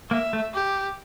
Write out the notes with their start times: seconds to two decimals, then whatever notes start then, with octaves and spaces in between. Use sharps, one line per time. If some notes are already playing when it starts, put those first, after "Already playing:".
0.11 A#3 E5
0.33 A3
0.55 G4